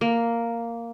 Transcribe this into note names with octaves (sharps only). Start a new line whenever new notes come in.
A#3